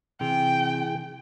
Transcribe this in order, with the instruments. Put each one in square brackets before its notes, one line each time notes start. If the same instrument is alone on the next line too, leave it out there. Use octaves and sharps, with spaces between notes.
[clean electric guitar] C3 [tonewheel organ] E3 G#4 [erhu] G5